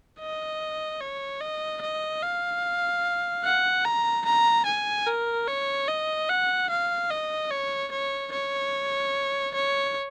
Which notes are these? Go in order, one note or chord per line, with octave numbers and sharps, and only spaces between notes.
D#5
C#5
D#5
D#5
F5
F#5
A#5
A#5
G#5
A#4
C#5
D#5
F#5
F5
D#5
C#5
C#5
C#5
C#5